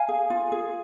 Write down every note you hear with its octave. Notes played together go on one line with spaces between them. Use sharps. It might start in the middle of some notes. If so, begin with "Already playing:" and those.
Already playing: F5 G#5
G#4
F4
G#4